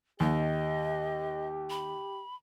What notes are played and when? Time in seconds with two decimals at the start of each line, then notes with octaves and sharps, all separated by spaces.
0.20 D#2 G4 D#5
1.70 B5